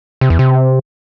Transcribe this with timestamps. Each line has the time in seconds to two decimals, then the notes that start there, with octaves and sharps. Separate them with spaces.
0.21 C3
0.30 E2
0.39 C3